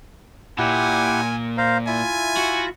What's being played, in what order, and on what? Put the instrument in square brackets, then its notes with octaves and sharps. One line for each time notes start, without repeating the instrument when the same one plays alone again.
[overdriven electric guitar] A#2 [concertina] E4 G4 F#5 [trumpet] G#5
[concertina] C5 F5 A#5
[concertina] E4 F4 E5 [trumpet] G#5
[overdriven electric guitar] F#4